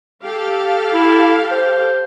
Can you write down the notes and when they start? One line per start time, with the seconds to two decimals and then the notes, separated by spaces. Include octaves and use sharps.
0.24 G4 A4 F5
0.94 E4
1.51 C5